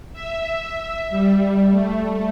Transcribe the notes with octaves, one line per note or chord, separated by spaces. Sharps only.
E5
E5
G3
A3